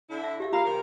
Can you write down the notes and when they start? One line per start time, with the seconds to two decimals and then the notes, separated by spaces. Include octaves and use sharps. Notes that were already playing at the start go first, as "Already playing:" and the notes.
0.10 D3 E4
0.24 E5
0.40 G4 E5 F5
0.53 A#3 F4 F5 A#5 B5
0.64 C3 G3 A#4